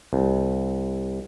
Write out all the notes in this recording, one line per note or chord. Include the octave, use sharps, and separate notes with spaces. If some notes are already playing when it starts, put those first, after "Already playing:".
C2